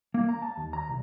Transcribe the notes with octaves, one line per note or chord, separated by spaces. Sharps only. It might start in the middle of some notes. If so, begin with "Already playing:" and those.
A#3
A#5
A5
D#2
A#5
C2